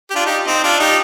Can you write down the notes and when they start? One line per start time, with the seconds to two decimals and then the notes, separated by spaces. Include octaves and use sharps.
0.11 G4
0.15 D4 F4
0.25 D#4 G4
0.47 C4 D#4
0.64 D4 F4
0.80 D#4 G4